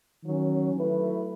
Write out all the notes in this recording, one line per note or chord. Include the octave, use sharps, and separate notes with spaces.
D#3 F#3 C#4
F#3 A3 E4 B4